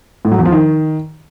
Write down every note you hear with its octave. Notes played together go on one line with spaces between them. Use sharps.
A2
F#3
E2
F3
D#3